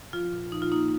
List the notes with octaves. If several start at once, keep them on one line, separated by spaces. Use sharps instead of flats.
F3 F4
A#2
F3 D#4
F4
A#3 D#4